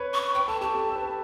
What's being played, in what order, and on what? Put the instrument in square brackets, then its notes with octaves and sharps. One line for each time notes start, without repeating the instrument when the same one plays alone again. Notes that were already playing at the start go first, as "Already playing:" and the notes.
Already playing: [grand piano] B4 C#5
[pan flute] C#6
[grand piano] B4 [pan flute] G5
[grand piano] A4 [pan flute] A5
[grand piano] G4 [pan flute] A5
[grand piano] A4
A4
B4